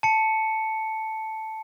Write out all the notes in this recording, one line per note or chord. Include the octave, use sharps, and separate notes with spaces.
A5 C#7